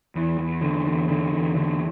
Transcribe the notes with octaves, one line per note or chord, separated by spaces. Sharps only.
E2
E2
D3
E2
D3
E2
D3